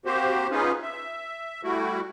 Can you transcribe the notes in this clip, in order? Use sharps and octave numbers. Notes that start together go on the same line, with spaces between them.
A#3 C4 F#4 G4 C5
B3 C#4 D#4 F4 G#4 B4
E5
G3 A3 E4 F#4